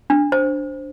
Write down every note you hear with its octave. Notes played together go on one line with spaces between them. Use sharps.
D4
C5